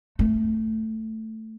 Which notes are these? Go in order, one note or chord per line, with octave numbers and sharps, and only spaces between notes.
A3